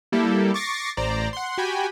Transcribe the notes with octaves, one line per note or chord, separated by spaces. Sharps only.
G3 A#3 E4 G4 A4
C#6 D6 A6 A#6 C7
A1 C5 D5 A#5
F#5 C6
F#4 G4 G5 G#5 B5